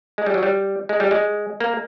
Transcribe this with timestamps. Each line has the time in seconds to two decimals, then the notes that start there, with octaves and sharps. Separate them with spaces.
0.18 G#3
0.26 G3
0.34 F#3
0.43 G3
0.89 G#3
1.00 G3
1.11 G#3
1.60 A#3